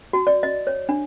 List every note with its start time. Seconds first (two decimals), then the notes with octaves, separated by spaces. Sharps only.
0.13 F#4
0.27 D5
0.43 D#5
0.67 C#5
0.89 D4